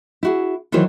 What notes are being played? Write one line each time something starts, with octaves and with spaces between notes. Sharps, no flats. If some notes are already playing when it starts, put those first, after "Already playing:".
E4 F#4 G#4
D#3 E3 F#3 E4 C5 C#5